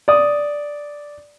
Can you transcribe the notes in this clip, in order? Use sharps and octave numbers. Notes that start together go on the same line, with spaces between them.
D5 D#6